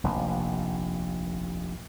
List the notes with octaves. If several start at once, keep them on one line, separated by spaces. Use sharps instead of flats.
F1 A#1 D#2